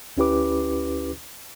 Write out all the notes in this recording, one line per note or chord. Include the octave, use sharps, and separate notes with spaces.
D2 C#4 E4 G4 B4 D6